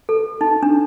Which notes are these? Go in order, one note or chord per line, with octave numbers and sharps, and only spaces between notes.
A4
D#4
D4